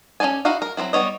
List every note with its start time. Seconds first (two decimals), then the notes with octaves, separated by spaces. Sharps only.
0.20 C#4 F#4 A4 D5 G#5
0.45 D#4 E4 F#4 F5
0.62 A#4
0.77 F#3 A3 C4 E4
0.93 G3 B3 C#5 D#5